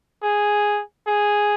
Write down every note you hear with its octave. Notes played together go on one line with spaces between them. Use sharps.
G#4
G#4